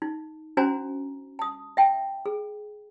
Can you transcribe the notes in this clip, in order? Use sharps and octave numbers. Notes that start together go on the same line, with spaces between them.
D#4
C#4 D4 F#4 C5 G#5 A#5
A5 D#6
E5 G5 A5
G#4